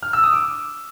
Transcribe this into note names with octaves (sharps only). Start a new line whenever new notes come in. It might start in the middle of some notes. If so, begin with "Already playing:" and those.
F6
E6
D#6
D6